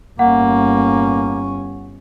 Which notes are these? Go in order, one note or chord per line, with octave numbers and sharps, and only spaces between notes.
G1 A#3 C#4 F#5